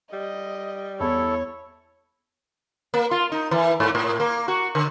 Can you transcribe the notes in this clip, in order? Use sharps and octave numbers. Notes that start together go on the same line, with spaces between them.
G3 D#5
E2 E4 A4 C#5
A#3
F4
D#4
E3
G#2
A2
A#3
F#4
D3